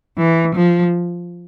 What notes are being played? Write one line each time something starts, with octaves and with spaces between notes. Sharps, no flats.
E3
F3